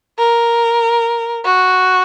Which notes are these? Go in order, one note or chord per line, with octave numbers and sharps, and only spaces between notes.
A#4
F#4